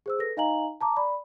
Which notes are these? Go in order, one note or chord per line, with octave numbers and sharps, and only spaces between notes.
G#4 C5 E6
A4 B4 A#6
D#4 D#5 F5 G#5 A#5 F#7
A5 A#5 D6
D5 B5